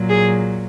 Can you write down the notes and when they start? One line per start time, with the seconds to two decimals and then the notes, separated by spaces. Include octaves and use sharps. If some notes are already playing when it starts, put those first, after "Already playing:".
Already playing: A#2 F#3
0.09 G#4